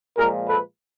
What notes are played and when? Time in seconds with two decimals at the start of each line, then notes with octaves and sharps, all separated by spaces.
0.18 A#2 F3 G#3 G#4 A#4
0.48 A4 B4